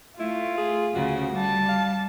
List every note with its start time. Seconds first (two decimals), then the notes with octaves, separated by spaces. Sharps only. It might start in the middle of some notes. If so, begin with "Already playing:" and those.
0.19 A3 E4 F4
0.57 G#4
0.95 D2 C#3 F#4
1.37 G3 A5
1.69 F5